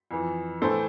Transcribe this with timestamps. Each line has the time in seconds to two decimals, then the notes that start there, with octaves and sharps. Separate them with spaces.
0.11 F2 E3
0.62 A2 E3 A4 C5